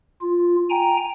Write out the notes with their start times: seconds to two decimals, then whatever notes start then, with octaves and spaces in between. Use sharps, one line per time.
0.21 F4
0.70 G5 G#5 A#5